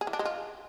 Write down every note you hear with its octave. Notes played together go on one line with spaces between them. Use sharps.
G#4
E3
D4
G#3
F4